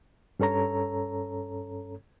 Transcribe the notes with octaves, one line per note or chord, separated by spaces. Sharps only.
G2 C#4 A4 C#5 A#5